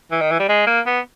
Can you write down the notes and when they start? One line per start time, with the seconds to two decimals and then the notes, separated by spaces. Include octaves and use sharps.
0.11 E3
0.21 D#3
0.31 E3
0.40 G3
0.49 G#3
0.67 A#3
0.86 B3